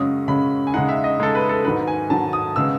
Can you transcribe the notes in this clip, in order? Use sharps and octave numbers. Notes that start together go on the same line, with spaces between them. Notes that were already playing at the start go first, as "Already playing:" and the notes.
Already playing: F#2 C#3 G#3 C#4 D#6
F#2 C#3 G#3 C#4 B5
G#5
C#3 G#3 D#4 F#5
E5
D#5
C#3 G#3 D#4 A4
B4
A4
G#2 D#3 F#3 B4
G#5
G#2 D#3 F#3 A5
D#6
C#3 G#3 B3 E6